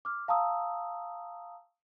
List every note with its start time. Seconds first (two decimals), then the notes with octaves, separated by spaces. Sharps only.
0.05 D6 F6
0.28 F5 A5 A#5 C#6 D#6 E6